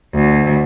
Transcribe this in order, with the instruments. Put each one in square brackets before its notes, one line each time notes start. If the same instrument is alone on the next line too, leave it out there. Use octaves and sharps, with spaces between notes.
[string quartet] D2